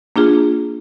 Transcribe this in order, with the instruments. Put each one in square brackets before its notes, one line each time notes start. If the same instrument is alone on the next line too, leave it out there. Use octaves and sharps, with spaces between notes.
[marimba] A#3 D4 F4 G#4